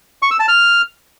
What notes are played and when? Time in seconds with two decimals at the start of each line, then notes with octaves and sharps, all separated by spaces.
0.22 C#6
0.31 E6
0.40 A5
0.48 F6